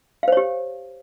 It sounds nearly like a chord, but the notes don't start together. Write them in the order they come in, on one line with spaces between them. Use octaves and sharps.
F5 C5 C#5 G4